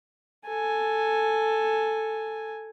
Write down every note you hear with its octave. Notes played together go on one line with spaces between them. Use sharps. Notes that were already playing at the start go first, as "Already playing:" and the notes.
A4 G#5